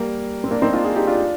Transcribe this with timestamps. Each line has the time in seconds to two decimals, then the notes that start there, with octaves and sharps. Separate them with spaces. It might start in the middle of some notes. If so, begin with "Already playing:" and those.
Already playing: G3 A#3
0.44 C4
0.51 A#3 D4
0.62 C4 D#4
0.73 D4 F4
0.85 F4 G#4
0.96 D#4 G4
1.07 D4 F4